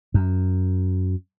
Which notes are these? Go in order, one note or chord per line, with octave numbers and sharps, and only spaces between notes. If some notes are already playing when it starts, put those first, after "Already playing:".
F#2